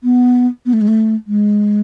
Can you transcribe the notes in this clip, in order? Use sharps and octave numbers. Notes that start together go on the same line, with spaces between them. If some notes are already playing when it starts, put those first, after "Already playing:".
B3
B3
A3
G#3
A3
G#3